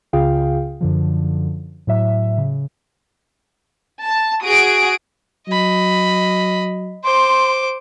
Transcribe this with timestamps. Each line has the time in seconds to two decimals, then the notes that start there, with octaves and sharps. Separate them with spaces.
0.13 C#2 C#3 F4 G#4 F5 G5
0.81 F#2 D3 F3
1.87 A2 F#3 E5
2.38 C#3
4.01 A5
4.44 F#4 G#4 D#6 D7
5.48 F#3 D#5 B5
7.04 C5 C6 D6